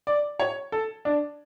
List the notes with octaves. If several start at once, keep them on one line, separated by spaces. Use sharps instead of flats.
D5
C#5
A4
D4